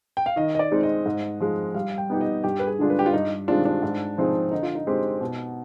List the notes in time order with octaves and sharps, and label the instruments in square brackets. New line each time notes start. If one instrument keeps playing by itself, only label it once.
[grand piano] G5
F5
[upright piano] D#3 [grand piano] D#5
[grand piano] D#5
D5
[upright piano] G#3 C4 D#4
[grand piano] D#5
[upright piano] G#2
F3 G#3
[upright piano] G3 [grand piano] F5
[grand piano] G5
[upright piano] B3 D#4 G4
[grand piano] D#5
[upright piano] G2 [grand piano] G4
[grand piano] B4
G#4
[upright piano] D3 G#3 D4 F4
[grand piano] B4
G4
F4
[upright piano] G2 [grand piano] D#4
[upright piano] D#3 G#3 C4 F4 [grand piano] D4
[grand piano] D4
[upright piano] G#2
F3 C4 D#4 G#4
[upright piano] D3 [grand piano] D#4
[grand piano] F4
D#4
[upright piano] G#3 C4 G4
B2